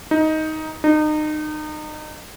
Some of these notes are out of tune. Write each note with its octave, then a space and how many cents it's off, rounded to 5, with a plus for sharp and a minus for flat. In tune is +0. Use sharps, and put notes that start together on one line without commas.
D#4 +10
D#4 -30